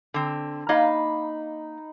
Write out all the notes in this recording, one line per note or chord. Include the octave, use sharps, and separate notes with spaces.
D3 C4
A#3 D#4 D#5 F5 B5